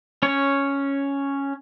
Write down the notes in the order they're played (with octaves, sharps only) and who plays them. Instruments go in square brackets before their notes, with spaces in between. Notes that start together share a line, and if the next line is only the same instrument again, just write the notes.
[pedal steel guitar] C#4 C#5